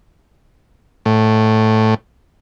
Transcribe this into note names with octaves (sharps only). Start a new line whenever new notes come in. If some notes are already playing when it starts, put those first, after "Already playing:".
A2